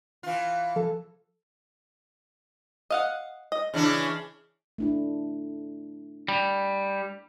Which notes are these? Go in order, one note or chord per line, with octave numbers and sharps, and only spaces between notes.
E3 F4
F3 A4
D#5 F5 F#5
D#5
C#3 E3 D4
A3 D4 E4
G3